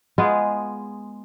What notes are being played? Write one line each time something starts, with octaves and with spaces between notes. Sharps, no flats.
G#3 B3 F4 G#4